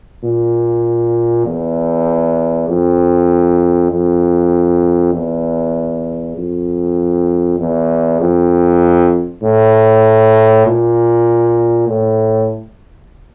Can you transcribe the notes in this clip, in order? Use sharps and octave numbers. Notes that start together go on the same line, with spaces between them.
A#2
E2
F2
F2
E2
F2
E2
F2
A2
A#2
A2